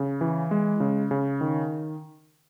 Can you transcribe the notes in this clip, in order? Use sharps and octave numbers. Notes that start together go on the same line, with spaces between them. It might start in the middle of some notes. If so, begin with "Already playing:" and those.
Already playing: C#3
E3
G#3
C#3
C#3
D#3